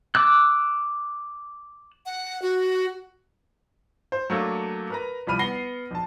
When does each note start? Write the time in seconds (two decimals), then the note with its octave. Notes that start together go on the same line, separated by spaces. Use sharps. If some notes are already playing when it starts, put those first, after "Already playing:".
0.15 D6 E6 F#6
2.06 F#5
2.42 F#4
4.12 C5
4.30 F#3 A3 A#3 D4
4.90 A#4 B4 A#5
5.27 C2 F3 G3 B5 F6 D#7
5.39 B3 F#5 A#6 C7 G7
5.91 A#1 A5